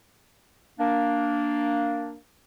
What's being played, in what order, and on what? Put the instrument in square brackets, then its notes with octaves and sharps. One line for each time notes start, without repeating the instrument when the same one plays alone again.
[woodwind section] A#3 D4